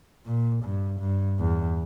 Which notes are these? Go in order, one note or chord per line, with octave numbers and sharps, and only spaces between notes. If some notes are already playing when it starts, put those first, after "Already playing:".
A#2
G2
G2
E2